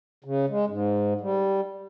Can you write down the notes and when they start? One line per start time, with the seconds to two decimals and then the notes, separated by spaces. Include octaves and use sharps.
0.24 C#3
0.49 G#3
0.67 G#2
1.21 G3